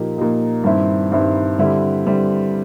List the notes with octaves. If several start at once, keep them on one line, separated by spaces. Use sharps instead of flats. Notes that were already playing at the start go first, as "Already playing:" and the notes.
Already playing: A#2 F3 A#3 D#4 G4
A#2 F3 A#3 D#4 G4
G2 D#3 G3 C4 E4
G2 D#3 G3 C4 E4
D3 G3 C4 E4
D3 G3 C4 E4